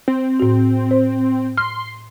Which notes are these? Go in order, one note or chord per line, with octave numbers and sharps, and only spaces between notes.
C4
A2 F#4
C5
C6 F6